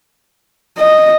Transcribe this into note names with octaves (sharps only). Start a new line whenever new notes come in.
D#5